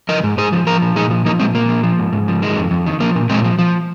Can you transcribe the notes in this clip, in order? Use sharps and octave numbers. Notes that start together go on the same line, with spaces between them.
F3 A#4 D#5
G#2
G#2 G#4 C5
F3
F3 F4 A#4
A#2
A#2 D#4 G#4
F3
F3 A#3 D#4
A#2 G#3 C4
A#2 A#3
F3
F3
G#2
G#2
F3
D#3 G#3
F2
F2
D#3
F3 A#3
A#2
A#2 G#3 C4
F3
F3